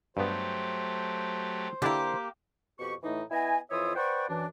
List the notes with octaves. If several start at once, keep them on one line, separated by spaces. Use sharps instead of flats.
G2 F#3 A3 B3 G4 C5
D3 A#3 D4 E4 G4
F2 B2 G4 C#6
A2 E3 A3 D#4
B3 E4 D#5 G#5
F2 E3 F4 C#5 E5 D#6
B4 C5 D5 F#5 G5 C#6
F#2 E3 D4